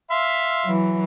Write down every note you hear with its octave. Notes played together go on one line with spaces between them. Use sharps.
E5 F5 C6
E3 F#3